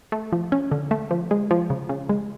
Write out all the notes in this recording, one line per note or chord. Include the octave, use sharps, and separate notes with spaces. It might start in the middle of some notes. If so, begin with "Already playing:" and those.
A3
F3
C#4
D3
A3
F3
G#3
F3
C#3
C#3
G#3